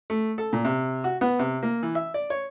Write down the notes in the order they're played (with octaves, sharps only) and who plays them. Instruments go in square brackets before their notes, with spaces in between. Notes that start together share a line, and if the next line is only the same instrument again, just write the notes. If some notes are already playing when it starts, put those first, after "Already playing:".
[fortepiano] A3
A4
A#2
C3
F#4
B3
C3
A#3
E3
E5
D5
C#5